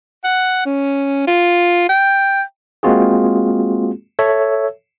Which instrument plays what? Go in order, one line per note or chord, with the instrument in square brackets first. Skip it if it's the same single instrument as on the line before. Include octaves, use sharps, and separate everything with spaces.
[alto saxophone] F#5
C#4
F4
G5
[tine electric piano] G#3 A#3 C4 F4 F#4 G#4
A4 C#5 E5